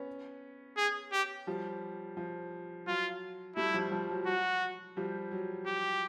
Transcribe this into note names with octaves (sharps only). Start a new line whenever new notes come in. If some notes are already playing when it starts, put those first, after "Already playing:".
Already playing: B3 C#4
G#4
G4
F3 G3
F3
F#3 F4
G3 A3 E4
F3 G3
F3
F#3
F#3 F#4
F3 G3
F#3
G4